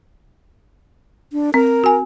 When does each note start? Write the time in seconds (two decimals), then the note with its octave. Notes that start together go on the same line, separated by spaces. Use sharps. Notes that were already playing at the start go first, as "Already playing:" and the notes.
1.33 D4
1.54 C4 A#4
1.84 F#4 G#5